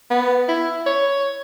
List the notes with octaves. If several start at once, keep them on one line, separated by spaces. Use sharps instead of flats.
B3
E4
C#5